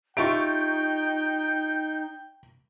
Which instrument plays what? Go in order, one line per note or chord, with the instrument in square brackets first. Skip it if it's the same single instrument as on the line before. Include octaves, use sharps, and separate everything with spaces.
[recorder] D#4 [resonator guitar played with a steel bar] F4 G4 E5 [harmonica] G5 [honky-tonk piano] C#6 D7